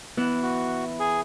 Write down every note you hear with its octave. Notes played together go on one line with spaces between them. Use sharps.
E3 B3 F#6
F#4
G#4